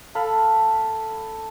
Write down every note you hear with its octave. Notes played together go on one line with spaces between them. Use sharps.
A4 F5 B5